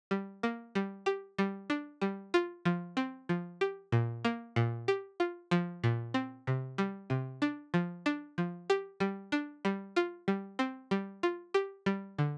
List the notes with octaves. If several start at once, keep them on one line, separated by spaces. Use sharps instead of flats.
G3
A#3
G3
G4
G3
D4
G3
F4
F3
C4
F3
G4
A#2
A#3
A#2
G4
F4
F3
A#2
C4
C3
G3
C3
D4
F3
D4
F3
G4
G3
D4
G3
F4
G3
C4
G3
F4
G4
G3
D3